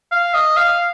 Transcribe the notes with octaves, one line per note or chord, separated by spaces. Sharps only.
F5
D#5
F5